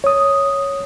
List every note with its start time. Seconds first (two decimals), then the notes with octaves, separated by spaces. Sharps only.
0.04 C#5 D#6